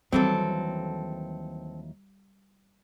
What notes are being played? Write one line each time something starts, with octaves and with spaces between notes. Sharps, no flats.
D#2 E3 F#3 G3 C4 A4